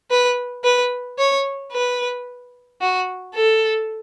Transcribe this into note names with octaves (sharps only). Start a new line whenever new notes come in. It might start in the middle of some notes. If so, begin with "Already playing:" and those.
B4
B4
C#5
B4
F#4
A4